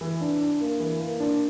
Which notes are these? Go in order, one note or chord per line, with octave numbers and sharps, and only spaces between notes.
E3
D4
D4
A#3
E3
A#3
D4